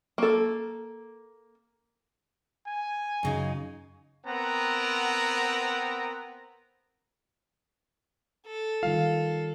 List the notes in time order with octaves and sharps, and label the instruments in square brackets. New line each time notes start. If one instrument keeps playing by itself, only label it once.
[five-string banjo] A#3 A4
[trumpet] G#5
[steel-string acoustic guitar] F#2 C#3 D#4
[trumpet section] B3 C4 A#4 F#5 A#5
[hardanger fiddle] A4
[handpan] D#3 G3 F4 [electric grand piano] F5